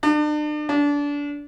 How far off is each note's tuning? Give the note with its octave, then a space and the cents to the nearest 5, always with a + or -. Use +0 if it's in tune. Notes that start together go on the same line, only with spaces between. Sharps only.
D4 +40
D4 -25